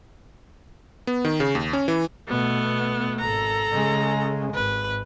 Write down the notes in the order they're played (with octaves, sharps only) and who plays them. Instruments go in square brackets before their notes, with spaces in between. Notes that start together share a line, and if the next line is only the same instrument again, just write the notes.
[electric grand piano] B3
D#3
C#3
D#2
C#4
E3
[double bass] B2 [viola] A3 B3
[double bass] G#1 [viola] A4 A#5
[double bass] C#3 G#3
[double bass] G#1 [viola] B4